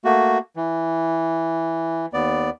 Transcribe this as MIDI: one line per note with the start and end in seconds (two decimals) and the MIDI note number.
0.05 0.38 57
0.05 0.38 58
0.05 0.38 66
0.56 2.06 52
2.13 2.50 39
2.13 2.50 59
2.13 2.50 74